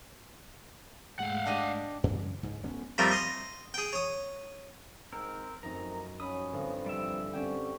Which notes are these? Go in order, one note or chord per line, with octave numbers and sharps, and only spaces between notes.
G#2 G#3 A3 F5 F#5
D4 G4 D#5
F#2 C#3 E3 G3
C#2 G#2
D1 D2 B3 C#4
F3 G3 A3 C4 F4 A#4
D#5 C6
G#4 G5
C#5 D#6
G#2 C4 A#4
F#2 F3 A3 C4 D#4 A#4 A#5
F3 F#3 C#4 B5 D#6
G1 C4
C3 E3 F3 G3 E5 D7
D3 C4 C#4 G4 G5